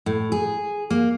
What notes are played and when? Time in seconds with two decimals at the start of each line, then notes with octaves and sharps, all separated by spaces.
0.06 A2
0.32 G#4
0.90 A#3